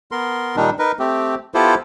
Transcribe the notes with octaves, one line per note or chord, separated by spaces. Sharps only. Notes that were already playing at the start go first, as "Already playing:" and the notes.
B3 A#4 C6
A#2 D#3 G3 D4 D#4
D#4 A#4 B4
A3 C4 G4
B3 E4 F4 G4 A4 C5